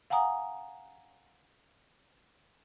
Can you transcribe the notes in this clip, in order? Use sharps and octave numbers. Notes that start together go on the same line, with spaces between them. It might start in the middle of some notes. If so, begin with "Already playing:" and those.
F5 F#5 G#5 A#5 D#6